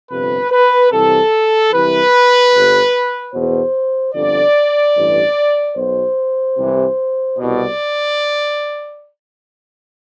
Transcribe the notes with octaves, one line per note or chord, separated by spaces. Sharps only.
G1 F2 C3 B4
B4
C2 C3 E3 A4
C2 C3 E3 B4
G1 G2 D3
E2 B2 C5
G1 F2 D3 D5
A1 G2 E3
B1 B2 C5
C2 C3 E3
C2 B2 D5